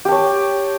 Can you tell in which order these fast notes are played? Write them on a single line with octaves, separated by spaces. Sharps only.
G4 A5 C#5